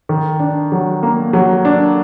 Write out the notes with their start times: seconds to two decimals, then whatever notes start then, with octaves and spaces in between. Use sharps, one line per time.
0.09 D#3
0.40 D4
0.72 F#3
1.03 A#3
1.33 F#3
1.65 D4